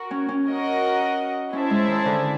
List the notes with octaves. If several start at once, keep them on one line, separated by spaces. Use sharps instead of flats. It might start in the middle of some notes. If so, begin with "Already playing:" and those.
Already playing: F#4 A#4
C#4
C#4
F#4 A#4 D#5 F#5
C#4 E4 G#4 C5 E5 A5
G#3
D#3
D3